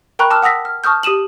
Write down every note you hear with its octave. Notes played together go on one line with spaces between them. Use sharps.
A#4 G5 A#5 B5 C#6 F#6
A5 D6 E6 F6
F#5 D#6 E6 A#6 B6
F6
A5 C#6 D#6 F6 G6
G4 D#6 D#7 E7 F#7